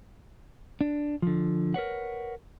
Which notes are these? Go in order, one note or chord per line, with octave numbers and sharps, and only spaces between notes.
D4
D3 F3
A#4 B4 C#5 F#5